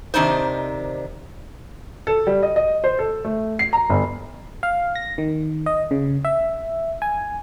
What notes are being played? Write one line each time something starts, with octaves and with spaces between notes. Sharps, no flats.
C3 D#3 D4 D#4 C5
A4
G3
D#5
D#5
C5
A4
A3
C7
A#5
G1
F5
A#6
D#3
D#5
C#3
E5
G#5